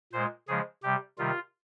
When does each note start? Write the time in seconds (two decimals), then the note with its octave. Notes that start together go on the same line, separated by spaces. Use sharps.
0.13 A#2 G#3 C5
0.48 C#3 F3 G#3 G#4
0.83 C3 G3 G4
1.18 C3 D#3 G3 F4